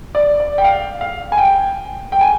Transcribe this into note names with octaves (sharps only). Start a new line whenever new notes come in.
D5
D5
G5
F5
F5
G#5
G5
G5
G#5